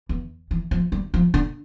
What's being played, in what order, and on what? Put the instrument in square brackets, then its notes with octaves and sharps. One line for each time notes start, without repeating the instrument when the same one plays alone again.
[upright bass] E2
E3
F3
G3
F3
D3